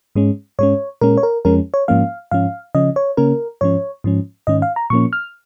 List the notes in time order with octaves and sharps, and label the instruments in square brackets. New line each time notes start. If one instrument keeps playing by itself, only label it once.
[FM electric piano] G#2 G#3 C#4
G#2 G#3 C#4 C#5
A#2 G#3 C#4 A#4
C#5
A#4
F2 F3 G#3 C#4 A#4
C#5
G#2 F3 A#3 C#4 F5
G#2 F3 C#4 F5
C#3 F3 C#4 D#5
C#5
C#3 A#3 C#4 A#4
G#2 F3 C#4 C#5
G#2 F3 C#4
G#2 D#3 C#4 D#5
F5
A#5
A#2 F3 A#3 C#4 C#6
F6